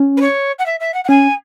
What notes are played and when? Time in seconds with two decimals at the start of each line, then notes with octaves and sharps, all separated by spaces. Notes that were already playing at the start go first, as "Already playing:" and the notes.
Already playing: C#4
0.17 B4
0.21 C#5
0.59 F#5
0.66 E5
0.80 E5
0.94 F#5
1.04 F#5
1.09 C#4 G#5